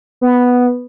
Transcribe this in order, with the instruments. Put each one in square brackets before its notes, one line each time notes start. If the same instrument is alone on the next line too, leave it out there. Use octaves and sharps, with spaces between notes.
[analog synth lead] B3